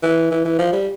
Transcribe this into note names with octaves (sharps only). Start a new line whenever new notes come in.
E3
E3
E3
F3
G3